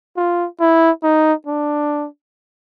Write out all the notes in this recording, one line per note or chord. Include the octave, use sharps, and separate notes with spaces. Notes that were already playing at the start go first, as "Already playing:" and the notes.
F4
E4
D#4
D4